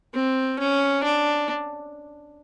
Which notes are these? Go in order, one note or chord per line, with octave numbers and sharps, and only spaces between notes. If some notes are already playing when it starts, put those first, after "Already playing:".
C4
C#4
D4